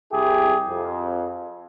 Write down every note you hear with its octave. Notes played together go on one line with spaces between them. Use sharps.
C2 E4 G4 G#4
F2